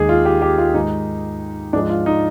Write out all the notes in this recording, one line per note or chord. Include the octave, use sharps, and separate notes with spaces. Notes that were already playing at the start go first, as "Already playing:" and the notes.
Already playing: D#2 D#3 G#3 G#4
F4
G4
G4
F4
G#2 D#3 G#3 D#4
G#2 F3 G#3 D4
F4
D#4